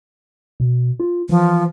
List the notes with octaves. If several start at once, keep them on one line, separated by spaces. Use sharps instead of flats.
B2
F4
E3 F3